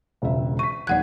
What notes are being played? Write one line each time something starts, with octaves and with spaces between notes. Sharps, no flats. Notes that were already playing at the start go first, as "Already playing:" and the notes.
E1 C#2 E5
C#6 B6 D#7
D#1 D#2 D5 F#5 F#6 G#6